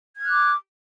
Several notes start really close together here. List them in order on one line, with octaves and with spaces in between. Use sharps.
G#6 F6 F#6 D6